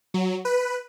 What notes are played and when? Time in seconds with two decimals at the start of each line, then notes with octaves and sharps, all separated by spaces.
0.14 F#3
0.45 B4